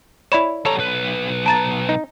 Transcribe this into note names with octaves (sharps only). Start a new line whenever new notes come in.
E4 C#5 D5 B5 E7
G3 A4 C#5 A#5
B1 B4
A5 A#5 A6
D#4